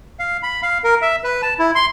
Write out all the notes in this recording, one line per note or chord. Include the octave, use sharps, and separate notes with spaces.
F5
B5
F5
A#4
E5
B4
A5
E4
C6